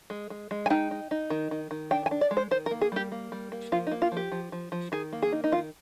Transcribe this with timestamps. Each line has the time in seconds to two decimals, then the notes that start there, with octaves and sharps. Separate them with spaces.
0.10 G#3
0.30 G#3
0.51 G#3
0.66 G#5
0.70 D#4 G5
0.91 D#4
1.11 D#4
1.30 D#3
1.51 D#3
1.71 D#3
1.91 D4 G5
2.06 G#5
2.11 D4
2.21 D5
2.31 G#3
2.37 C5
2.51 D#3 C5
2.66 A#4
2.71 A#3
2.81 G#4
2.92 G3 G4
3.12 A#3
3.32 G3
3.52 A#3
3.72 F3 F4
3.87 D#4
3.91 A#3
4.02 F4
4.12 F3 G4
4.32 F3
4.52 F3
4.72 F3
4.92 D#3 G#4
5.13 A#3
5.22 G#4
5.32 D#4
5.44 D#4
5.52 D#3 F4